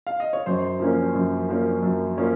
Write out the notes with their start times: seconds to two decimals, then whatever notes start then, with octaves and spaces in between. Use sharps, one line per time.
0.07 F5
0.20 D#5
0.33 C#5
0.46 F#2 C5
0.80 F3 A#3 C#4
1.15 F#2
1.49 F3 A#3 C#4
1.83 F#2
2.18 F3 A#3 C#4